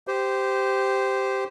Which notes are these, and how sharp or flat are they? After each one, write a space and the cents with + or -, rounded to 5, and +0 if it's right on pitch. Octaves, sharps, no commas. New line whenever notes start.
G4 -5 C5 -15